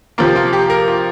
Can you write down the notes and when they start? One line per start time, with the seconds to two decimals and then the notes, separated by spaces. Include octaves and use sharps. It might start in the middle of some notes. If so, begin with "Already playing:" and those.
0.18 C3 F3 A#3 F4
0.36 F4
0.53 G4
0.70 A#4
0.88 F4